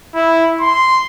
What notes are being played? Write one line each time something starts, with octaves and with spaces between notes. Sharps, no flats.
E4
C6